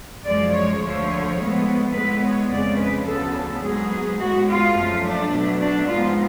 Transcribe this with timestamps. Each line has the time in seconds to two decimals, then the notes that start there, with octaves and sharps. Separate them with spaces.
0.24 F#2 F3 G#3 D5
0.52 C#5
0.81 D2 D3 F3 A3 C#5
1.37 A2 F3 G#3 B3
1.93 A2 G#3 B3 B4
2.22 C#5
2.50 F2 C#3 G#3 D5
2.78 B4
3.06 D2 C#3 F3 B3 A4
3.62 G#2 F#3 B3 G#4
4.18 A2 G#3 B3 F#4
4.47 F4
4.75 F#2 F3 A3
5.03 D4
5.31 B2 F#3 A3
5.60 D4
5.88 G#2 F3 B3 F4